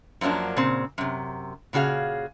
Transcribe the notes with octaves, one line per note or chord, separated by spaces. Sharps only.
F#2 F3 F#3 A#3 D4
A#2 C#3 C4
F#2 C3
A#2 C#3 F#4 G#4 F5